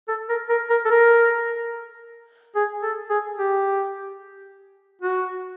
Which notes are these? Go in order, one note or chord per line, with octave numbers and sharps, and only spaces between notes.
A4
A#4
A#4
A#4
A4
A#4
G#4
A4
G#4
G4
F#4